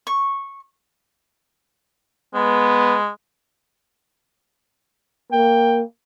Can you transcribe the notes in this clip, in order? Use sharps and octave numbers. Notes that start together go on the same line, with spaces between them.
C#6
G#3 B3
A#3 G5